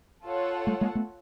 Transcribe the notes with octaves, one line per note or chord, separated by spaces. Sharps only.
F4 A4 C#5 F#5
G3 A3
G#3 A#3
A3 B3